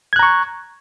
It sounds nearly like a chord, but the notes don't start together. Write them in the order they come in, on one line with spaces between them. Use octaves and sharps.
G#6 F#6 A#5 C#6